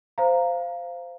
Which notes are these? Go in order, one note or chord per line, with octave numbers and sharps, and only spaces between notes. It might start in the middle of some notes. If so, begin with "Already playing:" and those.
C5 F5 A#5